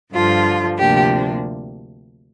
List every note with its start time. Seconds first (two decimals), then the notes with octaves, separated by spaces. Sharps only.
0.13 G2 D3 F3 F4
0.78 D2 C3 F3 A#3 D4 G4